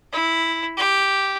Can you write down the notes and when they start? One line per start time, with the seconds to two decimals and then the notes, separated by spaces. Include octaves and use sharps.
0.12 E4
0.77 G4